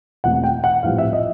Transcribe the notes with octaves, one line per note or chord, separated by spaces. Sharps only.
E1 E2 C3 E3 A3 F#5
G5
F#5
A#1 A2 E3 G3 C4 F5
E5
D#5